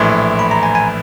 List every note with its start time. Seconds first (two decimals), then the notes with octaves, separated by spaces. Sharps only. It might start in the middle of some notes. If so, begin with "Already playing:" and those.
Already playing: A#1 A2 E3 C6
0.39 B5
0.51 A#5
0.63 G#5
0.75 G#5